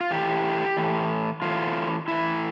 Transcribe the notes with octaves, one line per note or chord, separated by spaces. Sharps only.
F4
A2 E3 G4
A2 E3
A2 E3 F4
A2 E3 E4